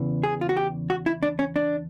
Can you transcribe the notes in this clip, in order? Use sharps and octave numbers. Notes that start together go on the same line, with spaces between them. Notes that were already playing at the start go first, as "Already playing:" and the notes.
Already playing: E2 C#3 E3
G#4
F4
F#4
G4
F#4
E4
D4
C#4
D4